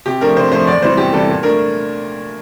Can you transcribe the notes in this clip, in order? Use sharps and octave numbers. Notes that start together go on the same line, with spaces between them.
C3 G4
F3 A3 D4 A#4
C3 C5
F3 A3 D4 C5
E2 D5
C3 E3 G3 C5
E2 G4
C3 E3 G3 A4
A#2
A3 D4 A#4